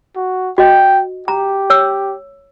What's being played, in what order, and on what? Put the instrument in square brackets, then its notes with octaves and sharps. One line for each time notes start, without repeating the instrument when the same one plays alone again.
[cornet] F#4
[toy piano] F#4 D#5 [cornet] G5
[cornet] G4 [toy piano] A#5
[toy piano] C#5 E6